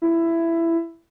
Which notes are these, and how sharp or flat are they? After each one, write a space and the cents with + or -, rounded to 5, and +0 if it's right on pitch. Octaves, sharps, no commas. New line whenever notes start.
E4 +15